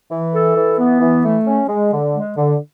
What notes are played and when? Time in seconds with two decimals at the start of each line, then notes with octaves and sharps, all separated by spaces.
0.11 E3
0.34 A4
0.56 E3
0.79 B3
1.01 E3
1.24 A3
1.46 C#4
1.69 G#3
1.92 D3
2.13 G#3
2.37 D3